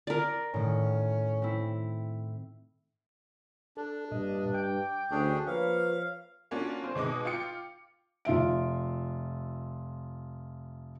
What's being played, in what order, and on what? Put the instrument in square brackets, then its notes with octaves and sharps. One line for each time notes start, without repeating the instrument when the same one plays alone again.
[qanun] A#4 D5
[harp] A2 D#3 [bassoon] C#4
[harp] C4 E4
[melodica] D4 [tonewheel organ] A4
[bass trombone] G2 [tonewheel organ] A#2 D#5
[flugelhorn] G5 [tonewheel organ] D6
[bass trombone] D2 [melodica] C#4 D4 G#4
[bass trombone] F3 [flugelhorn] A#3 [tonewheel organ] B4 C#5 [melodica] F5
[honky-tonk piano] A#3 C#4 D4 F4 F#4
C4 C5
B2 G#3 D#4 D6
F4 G5 C#7
[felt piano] F1 F4 E5 D7